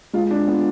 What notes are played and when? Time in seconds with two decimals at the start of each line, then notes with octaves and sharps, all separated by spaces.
0.13 G#3 F4
0.31 D4
0.47 B3 F4